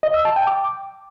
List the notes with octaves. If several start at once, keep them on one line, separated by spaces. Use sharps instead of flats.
D#5
E6
A5
G5
D6